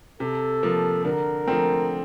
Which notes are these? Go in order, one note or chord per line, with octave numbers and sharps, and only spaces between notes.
C3 A4
F3 A#3
D3 A#4
F3 A3 C4